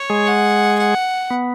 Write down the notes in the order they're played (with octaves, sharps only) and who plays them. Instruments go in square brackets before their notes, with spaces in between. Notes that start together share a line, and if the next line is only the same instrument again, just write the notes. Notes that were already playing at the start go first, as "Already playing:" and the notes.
Already playing: [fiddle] C#5
[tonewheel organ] G#3 G#4
[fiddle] F#5
F#5
[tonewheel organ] B3